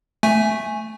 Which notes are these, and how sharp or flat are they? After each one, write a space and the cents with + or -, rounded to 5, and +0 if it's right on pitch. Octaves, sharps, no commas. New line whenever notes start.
A3 +0 G#5 +0